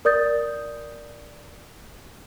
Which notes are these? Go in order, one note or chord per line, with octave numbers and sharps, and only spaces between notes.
A#4 D5 D#6 G6 A6